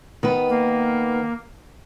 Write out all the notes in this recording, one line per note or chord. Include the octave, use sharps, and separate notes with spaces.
D#3 B3 B4
A#3